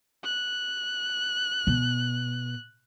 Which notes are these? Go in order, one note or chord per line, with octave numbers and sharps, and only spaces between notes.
F#6
B2